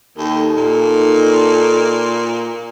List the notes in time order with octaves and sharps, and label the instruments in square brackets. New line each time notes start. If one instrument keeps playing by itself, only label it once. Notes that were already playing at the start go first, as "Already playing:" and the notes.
[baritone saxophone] D#2 [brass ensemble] D#4 A4
[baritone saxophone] A#2